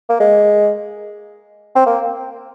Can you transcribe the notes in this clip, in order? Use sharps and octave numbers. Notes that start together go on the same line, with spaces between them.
A#3
G#3
C4
A#3